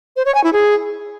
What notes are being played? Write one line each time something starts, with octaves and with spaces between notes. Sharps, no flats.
C5
C#5
G#5
E4
G#4